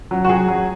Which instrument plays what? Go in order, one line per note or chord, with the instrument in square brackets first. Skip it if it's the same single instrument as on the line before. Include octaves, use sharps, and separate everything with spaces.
[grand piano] F#3
[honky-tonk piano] F#4
[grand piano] F#3 [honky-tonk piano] G#4
[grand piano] F#3